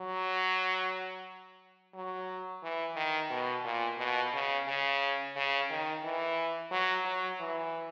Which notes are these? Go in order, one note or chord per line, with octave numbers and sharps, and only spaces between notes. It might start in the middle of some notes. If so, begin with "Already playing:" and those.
Already playing: F#3
F#3
E3
D#3
B2
A#2
B2
C#3
C#3
C#3
D#3
E3
F#3
F#3
E3